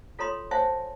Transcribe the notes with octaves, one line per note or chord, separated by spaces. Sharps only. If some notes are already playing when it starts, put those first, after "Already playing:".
F4 A4 C#5 A#5 C6 D#6
C5 C#5 E5 F#5 G#5 A5